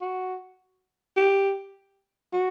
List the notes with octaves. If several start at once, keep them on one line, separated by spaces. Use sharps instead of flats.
F#4
G4
F#4